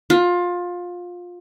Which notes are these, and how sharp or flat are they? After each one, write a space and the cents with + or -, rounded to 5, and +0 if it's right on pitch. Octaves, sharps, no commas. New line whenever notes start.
F4 +20